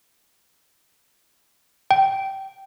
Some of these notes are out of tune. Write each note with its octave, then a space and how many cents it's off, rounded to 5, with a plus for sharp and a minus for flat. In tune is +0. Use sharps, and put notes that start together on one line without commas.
G5 -15